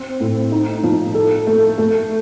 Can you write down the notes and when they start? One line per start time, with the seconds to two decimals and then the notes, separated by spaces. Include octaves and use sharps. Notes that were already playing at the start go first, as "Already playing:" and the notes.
Already playing: C4
0.20 A2
0.52 D#4
0.83 F3
1.14 A4
1.47 A3
1.78 A3